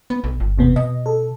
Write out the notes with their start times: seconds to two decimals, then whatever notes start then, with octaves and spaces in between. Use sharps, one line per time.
0.10 B3
0.24 B1
0.40 G1
0.58 E2 C3 B3
0.76 B2 D#5
1.06 A4